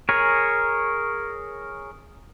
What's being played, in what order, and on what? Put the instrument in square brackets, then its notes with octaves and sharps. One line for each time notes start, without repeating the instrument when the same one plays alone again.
[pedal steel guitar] G#4 A#4 C#5